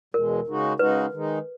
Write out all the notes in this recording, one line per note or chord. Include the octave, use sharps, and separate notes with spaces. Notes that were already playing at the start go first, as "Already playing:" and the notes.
E2 B2 G#3 A#4
C#3 G#3 D#4 F#4
C#3 G#3 D#4 F#4 B4
D#3 G#3 D#4